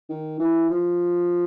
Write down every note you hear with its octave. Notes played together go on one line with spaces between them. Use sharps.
D#3
E3
F3